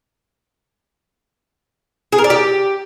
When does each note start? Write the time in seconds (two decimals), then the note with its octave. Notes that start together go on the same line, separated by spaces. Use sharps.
2.12 G#4
2.18 A#4
2.24 D5
2.30 G4